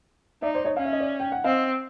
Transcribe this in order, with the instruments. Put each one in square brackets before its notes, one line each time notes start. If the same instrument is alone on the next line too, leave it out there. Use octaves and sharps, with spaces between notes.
[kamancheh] D#4 [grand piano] D5 E5
[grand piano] C5 D5
C#5 D#5
[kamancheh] C#4 [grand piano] F5
[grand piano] E5
D#5
D5 E5
G5
F#5
[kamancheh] C4 [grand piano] D#5 F5